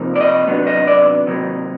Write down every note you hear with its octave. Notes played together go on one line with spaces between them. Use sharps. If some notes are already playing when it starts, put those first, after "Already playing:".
Already playing: C3 F3 A#3 D#4
D5
D#5
C3 D#3 F#3 B3 D4
D#5
D5
C3 D#3 F#3 A#3 D#4